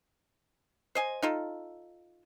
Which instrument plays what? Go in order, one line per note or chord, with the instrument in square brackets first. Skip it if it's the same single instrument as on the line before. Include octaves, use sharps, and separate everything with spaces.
[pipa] C5 D#5 G#5
D#4 F4 A4